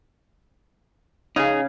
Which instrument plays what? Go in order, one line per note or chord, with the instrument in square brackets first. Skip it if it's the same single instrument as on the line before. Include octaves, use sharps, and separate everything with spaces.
[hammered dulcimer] C#3 [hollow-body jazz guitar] D#4 G#4